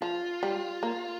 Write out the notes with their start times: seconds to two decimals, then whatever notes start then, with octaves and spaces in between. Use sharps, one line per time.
0.02 F3 F4
0.43 G3
0.83 A#3